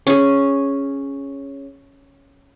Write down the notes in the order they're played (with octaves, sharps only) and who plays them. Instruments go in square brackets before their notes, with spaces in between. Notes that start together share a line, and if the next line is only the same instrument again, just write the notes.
[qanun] C#4 G#4